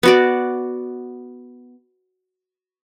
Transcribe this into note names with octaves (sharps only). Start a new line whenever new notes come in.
B3 F#4 D5